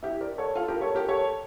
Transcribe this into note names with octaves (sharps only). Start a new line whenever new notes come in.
E4 G4
A#4 D5
A4 C#5
F4 A4
G4 A#4
A4 C#5
G4 A#4
A4 C#5